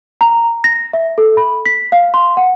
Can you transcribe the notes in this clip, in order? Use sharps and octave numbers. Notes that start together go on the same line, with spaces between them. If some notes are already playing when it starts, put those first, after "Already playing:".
A#5
A#6
E5
A4
B5
B6
F5
C6
F#5